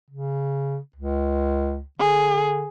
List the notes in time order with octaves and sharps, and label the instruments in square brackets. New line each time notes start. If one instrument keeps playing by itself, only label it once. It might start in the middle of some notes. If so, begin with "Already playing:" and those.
[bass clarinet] C#3
C#2
[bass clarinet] D3 [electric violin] G#4